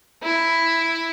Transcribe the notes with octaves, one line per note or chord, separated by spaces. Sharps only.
E4